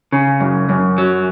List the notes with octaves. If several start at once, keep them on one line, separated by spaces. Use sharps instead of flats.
C#3
F#2
F#2
F#3